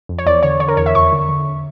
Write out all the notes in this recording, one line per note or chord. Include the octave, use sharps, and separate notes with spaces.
F2
C#5
E2 D5
D3 C#5
D3 C#5
A#4
E2 C#5
E5
F2 C#6
D3
D3